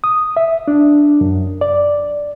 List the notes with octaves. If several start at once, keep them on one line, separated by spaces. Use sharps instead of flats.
D#6
E5
D4
F#2
D5